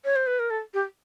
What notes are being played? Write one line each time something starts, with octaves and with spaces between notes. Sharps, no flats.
C#5
C5
B4
A#4
A4
G4